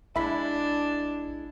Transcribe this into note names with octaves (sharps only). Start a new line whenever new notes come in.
A1 G#3 D4 E4 E5 B5 B6